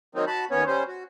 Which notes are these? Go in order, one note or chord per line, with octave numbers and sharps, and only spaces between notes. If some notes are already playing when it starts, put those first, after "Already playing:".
D#3 F#3 A#3 C4 D#4
F#4 A5 B5
D#2 B3 C#4 C#5
G3 C#4 C5
F#4